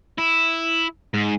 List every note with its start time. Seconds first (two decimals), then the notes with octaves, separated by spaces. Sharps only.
0.18 E4
1.14 G#2